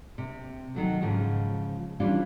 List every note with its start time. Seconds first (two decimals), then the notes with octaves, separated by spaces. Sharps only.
0.18 C3
0.75 D#3 F#3 A3
1.01 G#2 C#3 F3 G#3
2.00 E3 G3 C#4 D4 F4